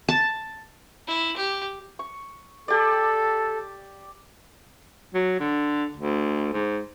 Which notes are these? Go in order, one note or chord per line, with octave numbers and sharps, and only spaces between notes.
A5
E4
G4
C#6
G4 A4 D5
F#3
D3
D2
G#2